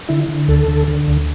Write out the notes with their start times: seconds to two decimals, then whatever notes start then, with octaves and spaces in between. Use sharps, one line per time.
0.09 D3 E4
0.28 D3
0.48 D2 A4
0.68 D3
0.88 D3
1.07 D2